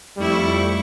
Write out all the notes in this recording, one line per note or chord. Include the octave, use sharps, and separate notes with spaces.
F2 G3 A3 E4 C#6